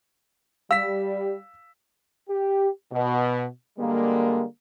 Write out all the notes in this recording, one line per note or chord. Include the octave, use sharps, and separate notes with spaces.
G3 F5 E6 B6
G4
B2
D3 G3 G#3 A#3